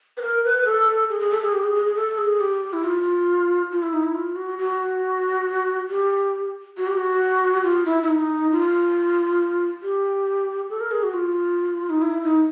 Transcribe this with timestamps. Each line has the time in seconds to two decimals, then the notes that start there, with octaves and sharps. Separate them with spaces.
0.17 B4
0.22 A#4
0.44 B4
0.65 A4
1.09 G#4
1.20 G#4
1.31 A4
1.42 G#4
1.53 G4
1.63 G#4
1.75 G#4
1.86 G#4
1.96 A4
2.18 G#4
2.40 G4
2.73 E4
2.84 F4
3.71 F4
3.83 E4
3.93 D#4
4.03 E4
4.15 F4
4.36 F#4
4.59 F#4
5.90 G4
6.78 F#4
6.88 G4
6.97 F#4
7.64 F4
7.86 E4
8.03 E4
8.08 D#4
8.52 F4
9.83 G4
10.70 A4
10.80 A#4
10.91 G#4
11.03 F#4
11.14 F4
11.90 D#4
12.02 E4
12.23 D#4